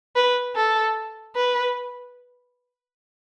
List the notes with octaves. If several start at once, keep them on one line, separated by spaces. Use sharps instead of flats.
B4
A4
B4